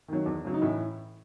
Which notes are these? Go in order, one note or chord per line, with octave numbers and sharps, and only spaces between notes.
D#3 F#3
E2
C#3 F#3
D#4
A2 E3 E4